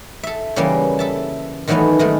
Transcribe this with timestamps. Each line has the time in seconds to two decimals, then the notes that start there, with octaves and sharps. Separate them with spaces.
0.23 A4 E5
0.56 C#3 E3 G3 A#3 C#4
0.99 A4 E5 A5
1.67 D#3 E3 F#3 A3 B3 C#4
1.99 D#3 G#3 A3